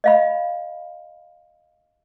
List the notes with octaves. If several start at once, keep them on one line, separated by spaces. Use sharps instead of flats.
D#5 F5 B5